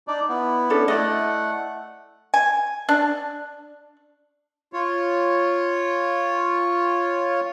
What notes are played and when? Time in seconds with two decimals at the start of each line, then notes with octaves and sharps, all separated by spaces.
0.08 D4 D#4 D5
0.29 B3 E4
0.70 C#4 D4 A4
0.88 A3 E4 D5 D#5 F#5
2.34 G#5
2.89 D4
4.73 F4 C#5